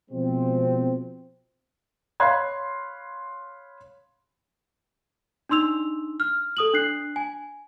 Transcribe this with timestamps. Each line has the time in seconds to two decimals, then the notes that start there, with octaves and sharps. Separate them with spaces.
0.10 B2 F3 G#3 C4
2.20 C#5 F5 B5 C6 F#6 G#6
5.49 D4 D#4 C6 E6 F7
6.20 F6
6.57 A4 D#6 F#7
6.73 D4 F#6 C7
7.16 G#5